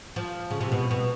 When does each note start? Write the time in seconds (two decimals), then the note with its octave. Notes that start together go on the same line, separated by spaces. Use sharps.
0.16 F3
0.50 C#3
0.61 C3
0.72 B2
0.91 B2